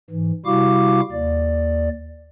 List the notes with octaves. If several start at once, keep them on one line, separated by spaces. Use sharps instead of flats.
G#2 E3
C3 G3 E4 F#4 F5 D6
D#2 D5